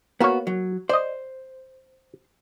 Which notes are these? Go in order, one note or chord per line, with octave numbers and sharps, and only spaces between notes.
A#3 B3 F#4 C#5
F#3
C5 D5 D#5